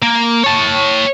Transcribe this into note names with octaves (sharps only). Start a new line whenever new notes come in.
A#3
C#5 A5